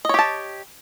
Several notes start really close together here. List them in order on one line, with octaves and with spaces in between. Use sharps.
D#5 C#5 G4 A5